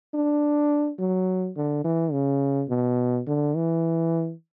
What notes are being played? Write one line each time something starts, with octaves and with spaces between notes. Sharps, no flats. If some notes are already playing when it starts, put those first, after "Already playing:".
D4
F#3
D3
E3
C#3
B2
D3
E3